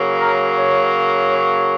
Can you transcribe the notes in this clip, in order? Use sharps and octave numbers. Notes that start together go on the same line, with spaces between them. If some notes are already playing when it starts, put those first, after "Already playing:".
Already playing: C#3 F#3 A#3
A#4
C#5
C#5